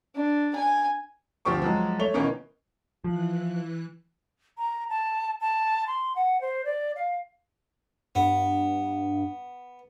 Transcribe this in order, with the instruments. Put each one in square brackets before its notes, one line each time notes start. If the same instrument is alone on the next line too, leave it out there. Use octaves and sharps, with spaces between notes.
[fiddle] D4
G#5
[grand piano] D2 F3 C4 G4 C#6 D6
F3 F#3 G#3
A3 C#5 F7 G7
B2 D#3 E3 A#3 B3 C#4
[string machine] E3 F#6 [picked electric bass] F3
[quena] A#5
A5
A5
C6
F#5
C5
D5
F5
[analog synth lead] G2 [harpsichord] B3